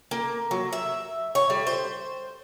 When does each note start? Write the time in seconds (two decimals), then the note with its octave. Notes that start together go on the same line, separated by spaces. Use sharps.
0.11 A#3
0.51 F#3
0.73 E5
1.35 C#5
1.50 G3
1.67 C5